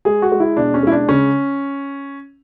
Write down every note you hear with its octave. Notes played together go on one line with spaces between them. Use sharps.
G#3 G#4
F#4
G#3
E4
B2 D4
C#4
G#3 E4
D4
C#3 C#4